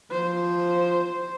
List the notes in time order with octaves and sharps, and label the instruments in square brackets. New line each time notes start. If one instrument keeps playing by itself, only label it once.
[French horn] F3 [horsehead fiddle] C5